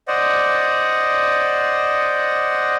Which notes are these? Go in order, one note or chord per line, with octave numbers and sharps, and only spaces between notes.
C5 D5 D#5 F#5